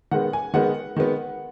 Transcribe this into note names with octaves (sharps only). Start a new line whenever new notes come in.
D#3 G#3 B3 F#5
G#5
D#3 G#3 B3 F#5
D#3 G#3 B3